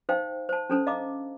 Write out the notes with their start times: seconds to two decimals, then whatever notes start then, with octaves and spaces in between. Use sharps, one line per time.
0.09 D#4 C5 F5 G5
0.49 C5 A5
0.70 C#4 D4 A4 C5 A5
0.87 D#5 F5 A#5 D6